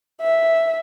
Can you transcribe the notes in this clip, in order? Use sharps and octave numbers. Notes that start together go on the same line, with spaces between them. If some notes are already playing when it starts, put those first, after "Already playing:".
E5